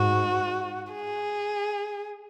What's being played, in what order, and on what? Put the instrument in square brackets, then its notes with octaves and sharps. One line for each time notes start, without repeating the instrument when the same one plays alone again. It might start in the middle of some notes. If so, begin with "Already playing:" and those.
Already playing: [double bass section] G#2 [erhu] F#4
[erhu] G#4